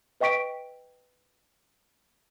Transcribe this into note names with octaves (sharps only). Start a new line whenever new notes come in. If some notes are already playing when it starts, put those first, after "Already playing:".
B4 D#5 G5 C#6 B6 D7